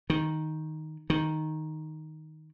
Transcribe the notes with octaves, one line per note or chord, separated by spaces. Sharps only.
D#3
D#3